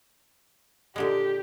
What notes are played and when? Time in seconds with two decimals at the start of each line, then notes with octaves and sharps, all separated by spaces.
0.96 A#2 D3 G#3 G4